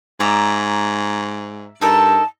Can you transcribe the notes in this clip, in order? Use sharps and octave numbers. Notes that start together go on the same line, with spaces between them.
G#2 D5 E5 A#5
G2 D#4 A4 A#4 A5